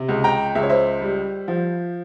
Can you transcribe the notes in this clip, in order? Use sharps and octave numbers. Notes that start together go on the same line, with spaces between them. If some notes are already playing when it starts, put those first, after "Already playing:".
Already playing: C3
C#2
G5 A#5
C#2 E5
C#5
C5 E5
G3
F3